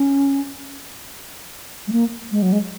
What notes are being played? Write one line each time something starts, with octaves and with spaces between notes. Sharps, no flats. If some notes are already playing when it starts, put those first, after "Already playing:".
Already playing: C#4
G#3
A#3
G#3
F#3
G#3